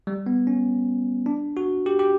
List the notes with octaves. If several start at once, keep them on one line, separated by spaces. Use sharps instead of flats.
G3
B3
C#4
D4
F#4
G4
G4